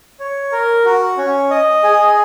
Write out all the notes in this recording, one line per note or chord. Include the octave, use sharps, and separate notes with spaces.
C#5
A#4
F#4
C#4
D#5
G#4